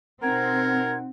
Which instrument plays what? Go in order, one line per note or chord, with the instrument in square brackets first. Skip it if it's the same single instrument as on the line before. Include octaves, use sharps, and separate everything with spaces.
[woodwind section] B2 D#4 F#5 [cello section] C4 [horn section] A#4 [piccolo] G#6